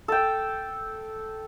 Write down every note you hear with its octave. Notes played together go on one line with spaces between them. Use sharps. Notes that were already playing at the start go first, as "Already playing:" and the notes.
A4 G5